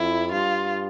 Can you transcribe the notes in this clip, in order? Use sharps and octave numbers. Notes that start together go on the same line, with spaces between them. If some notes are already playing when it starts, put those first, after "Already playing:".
Already playing: F2 E4
G2 F4